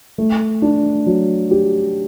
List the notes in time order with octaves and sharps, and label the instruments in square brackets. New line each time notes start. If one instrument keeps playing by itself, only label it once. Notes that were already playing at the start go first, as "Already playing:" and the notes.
[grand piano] A3
D4
F#3
G4